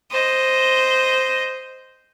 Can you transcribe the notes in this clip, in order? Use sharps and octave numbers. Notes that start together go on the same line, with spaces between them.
C5 D#5